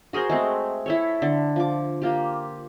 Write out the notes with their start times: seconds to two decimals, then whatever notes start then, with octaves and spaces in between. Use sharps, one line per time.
0.13 F#4 G#4 A#4 C5
0.30 G#3 A3 C4
0.86 E4 A4 C#5
1.22 D3
1.56 F3 D6
2.02 A#3 F4 G4